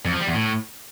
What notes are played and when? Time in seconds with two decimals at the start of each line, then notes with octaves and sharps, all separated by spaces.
0.05 F2
0.13 F3
0.20 G3
0.27 E2
0.35 A2